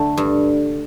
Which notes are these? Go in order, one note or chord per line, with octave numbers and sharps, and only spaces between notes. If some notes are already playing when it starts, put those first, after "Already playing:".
Already playing: D3 A3
G2